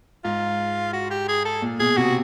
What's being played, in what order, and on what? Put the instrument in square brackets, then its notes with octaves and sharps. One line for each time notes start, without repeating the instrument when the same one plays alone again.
[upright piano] G#2 [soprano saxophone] F4
[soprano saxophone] F#4
G4
G#4
A4
[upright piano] A#2
[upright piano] B2 [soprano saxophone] G#4
[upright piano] C3 [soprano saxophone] F#4